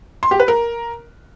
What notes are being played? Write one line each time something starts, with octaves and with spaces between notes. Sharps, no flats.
C6
G4
B4
A#4